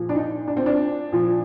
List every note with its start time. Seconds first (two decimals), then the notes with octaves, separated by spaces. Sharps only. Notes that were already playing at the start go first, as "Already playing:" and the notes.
Already playing: A#2 F3
0.09 D4
0.15 D#4
0.47 D4
0.57 C4
0.66 D4
1.12 A#2 F3